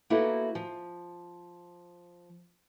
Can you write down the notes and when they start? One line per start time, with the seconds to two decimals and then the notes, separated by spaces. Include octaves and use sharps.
0.10 A#3 B3 D#4 E4 F#4 A4
0.55 F3